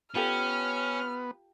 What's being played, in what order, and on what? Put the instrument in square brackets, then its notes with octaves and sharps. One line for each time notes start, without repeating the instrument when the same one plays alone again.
[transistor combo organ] B3 [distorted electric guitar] C#4 [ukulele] F4 G4 A4 [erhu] F6